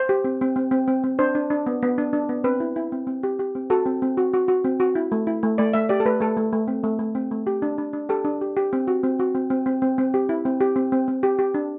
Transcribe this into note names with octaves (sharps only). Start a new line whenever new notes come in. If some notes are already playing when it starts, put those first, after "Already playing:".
Already playing: C5
G4
C4
C4
C4
C4
C4
C4
D4 C5
D4
D4
B3
B3
D4
D4
B3
C4 B4
E4
E4
C4
C4
G4
G4
C4
F#4 A4
C4
C4
F#4
F#4
F#4
C4
F#4
E4
A3
E4
A3
A3 D5
A3 E5
G4 D5
A4
A3 B4
A3 A4
A3
A3
C4
A3
A3
C4
A3
G4
D4
D4
D4
G4 A4
D4
G4
G4
C4
F#4
C4
F#4
C4
C4
C4
C4
C4
G4
E4
C4
G4
C4
C4
C4
G4
G4
D4